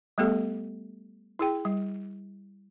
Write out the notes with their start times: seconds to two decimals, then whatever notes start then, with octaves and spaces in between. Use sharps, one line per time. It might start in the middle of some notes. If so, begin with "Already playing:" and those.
0.18 G3 A3 B3 G4 A4
1.39 E4 G#4 G5
1.65 G3